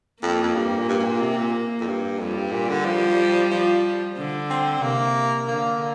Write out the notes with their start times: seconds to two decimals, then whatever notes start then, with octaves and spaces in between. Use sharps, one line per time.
0.23 F2 A#3
0.43 F2
0.55 G2
0.79 A#2
0.89 G2
1.00 G2
1.04 A#2
1.20 C3
1.38 A#2
1.80 F2
1.87 G2
2.19 F2 G3
2.35 G2
2.53 A#2
2.69 D3
2.85 F3
3.51 F3
4.17 D3
4.50 C4
4.83 C3 A#3
5.48 D3 A#3